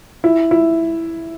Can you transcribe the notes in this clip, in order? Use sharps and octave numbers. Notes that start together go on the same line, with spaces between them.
E4
E4